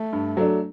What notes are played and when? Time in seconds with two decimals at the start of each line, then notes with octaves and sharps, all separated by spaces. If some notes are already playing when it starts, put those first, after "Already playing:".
Already playing: A3
0.13 G2
0.37 F#3 A3 D4